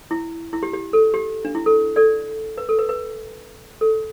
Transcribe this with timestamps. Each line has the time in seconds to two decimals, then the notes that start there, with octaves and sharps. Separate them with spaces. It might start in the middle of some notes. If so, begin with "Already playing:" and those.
0.11 E4
0.53 E4
0.63 G4
0.73 G4
0.93 A4
1.14 G4
1.45 D4
1.55 E4
1.66 A4
1.96 A4 D5
2.58 B4
2.69 A4
2.79 B4
2.89 B4
3.81 A4